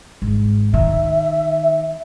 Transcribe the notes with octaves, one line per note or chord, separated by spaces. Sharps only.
G#1
D#3 E5